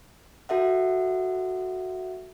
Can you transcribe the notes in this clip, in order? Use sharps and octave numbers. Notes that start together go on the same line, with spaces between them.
F#4 A4 E5 F#5